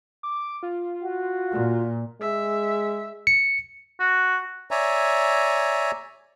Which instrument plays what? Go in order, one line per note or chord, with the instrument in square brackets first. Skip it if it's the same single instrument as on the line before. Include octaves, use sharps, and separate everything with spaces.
[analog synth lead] D6
F4
[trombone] F#4
[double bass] A#2
[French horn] G#3 [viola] E5
[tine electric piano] C#7
[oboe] F#4
[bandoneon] C#5 D5 E5 G#5 A#5